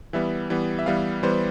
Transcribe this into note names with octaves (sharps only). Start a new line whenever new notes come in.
E3 G3 B3 E5
E3 G3 B3
E5
E3 G3 B3 F5
E3 G3 B3 C5